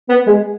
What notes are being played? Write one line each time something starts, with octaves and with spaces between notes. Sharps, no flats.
B3
G#3